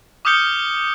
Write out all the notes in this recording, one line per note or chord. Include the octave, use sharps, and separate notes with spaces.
D6 D#6 F6 G6 C#7 G7